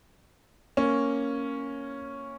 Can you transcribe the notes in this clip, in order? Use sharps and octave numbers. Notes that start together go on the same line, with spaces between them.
A#3 C#4